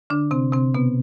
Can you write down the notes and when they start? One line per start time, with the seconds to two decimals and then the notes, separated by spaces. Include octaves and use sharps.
0.10 D3 D4
0.31 C3 C4
0.53 C3 C4
0.75 B2 B3